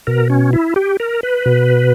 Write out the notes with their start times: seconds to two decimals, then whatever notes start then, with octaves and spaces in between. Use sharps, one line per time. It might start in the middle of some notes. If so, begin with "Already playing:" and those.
0.07 B2 A#4
0.30 C#4
0.53 E4
0.76 G4
1.00 A#4
1.23 B4
1.46 B2